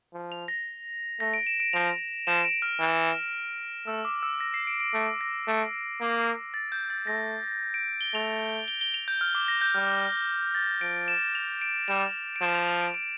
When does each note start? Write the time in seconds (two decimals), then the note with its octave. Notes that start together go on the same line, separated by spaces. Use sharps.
0.14 F3
0.32 F7
0.48 A#6
1.20 A3 A#6
1.34 D7
1.47 E7
1.60 D7
1.73 F3 F7
2.27 F3 E7
2.45 D7
2.62 F6
2.80 E3
3.86 A3 E6
4.05 D6
4.23 E6
4.40 A#6
4.54 C7
4.67 D7
4.80 D7
4.94 A3
5.21 A#6
5.47 A3
6.01 A#3
6.54 A6
6.72 G6
6.90 A6
7.07 A3 A#6
7.74 D7
8.01 G7
8.14 A3 F7
8.68 G7
8.81 G7
8.94 F7
9.08 G6
9.21 F6
9.35 D6
9.48 A#6
9.61 G6
9.74 G3 F6
10.55 A6
10.81 F3 D7
11.08 E7
11.35 F7
11.62 D7
11.88 G3 E7
12.36 D7
12.41 F3 E7
12.55 F7
12.68 F7
12.81 D7
12.94 D7